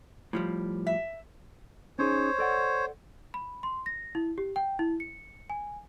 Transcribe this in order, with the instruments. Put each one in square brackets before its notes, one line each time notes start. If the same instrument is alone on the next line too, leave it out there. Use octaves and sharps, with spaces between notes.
[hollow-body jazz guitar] A2 F3 G3
[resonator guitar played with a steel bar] E5
[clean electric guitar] C#4 D#4 G#4 [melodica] C5 C#5
[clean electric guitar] A4 D5 F#5
[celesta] B5
C6
A#6
E4
G4
G5
E4
C#7
G#5